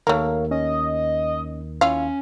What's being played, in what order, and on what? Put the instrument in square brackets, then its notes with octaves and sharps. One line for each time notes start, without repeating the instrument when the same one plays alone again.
[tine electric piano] D#2 D#3 [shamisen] A3 A#3 [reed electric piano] A#4 C#5 F5
[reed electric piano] C#4 [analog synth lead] D#5
[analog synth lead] C#4 [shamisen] E4 F4 F5